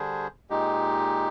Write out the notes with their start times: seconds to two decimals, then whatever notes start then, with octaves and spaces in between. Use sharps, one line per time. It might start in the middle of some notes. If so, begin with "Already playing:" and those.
Already playing: D3 G3 D4 G#4 C5
0.50 A#2 G#3 D#4 G4